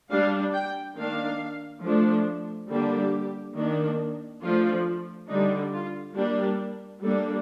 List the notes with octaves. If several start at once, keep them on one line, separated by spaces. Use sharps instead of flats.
G3 D4 F5
G5
D#3 A#3 D4 F5
F3 A3 D4
D3 G3 A#3 D4 G4
D#3 A#3 D4
F3 A3 D4 F4
D3 G3 D4 D#4
F4
G3 A#3 D4 G4
G3 A#3 D4 A4